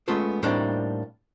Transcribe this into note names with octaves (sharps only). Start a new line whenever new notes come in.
G#3 A3 B3 C#4 F4 A4
A2 G3 A#3 C4 D4 D#4